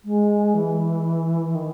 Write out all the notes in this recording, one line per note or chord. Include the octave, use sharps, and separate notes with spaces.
G#3
E3
D#3